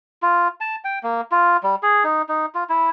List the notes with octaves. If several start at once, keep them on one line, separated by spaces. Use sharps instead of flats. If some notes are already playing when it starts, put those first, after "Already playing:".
F4
A5
G5
A#3
F4
G3
G#4
D#4
D#4
F4
E4